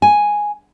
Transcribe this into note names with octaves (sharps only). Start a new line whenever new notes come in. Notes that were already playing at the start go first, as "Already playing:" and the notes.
G#5